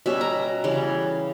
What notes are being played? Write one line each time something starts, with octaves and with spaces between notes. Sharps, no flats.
B2 G3 C#4 E5
A#5
C#3 E3 G3